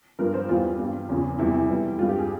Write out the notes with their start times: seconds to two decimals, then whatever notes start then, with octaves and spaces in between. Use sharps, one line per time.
0.19 G2 F3 A#4
0.34 C5
0.49 E2 E3 G3 F4
0.79 G2 G3
1.09 E2 C#3 F3
1.39 E2 C3 G3 E4
1.54 E4
1.69 F2 E3 G3 E4
1.98 G3 F4
2.02 G2
2.09 G4
2.19 G#4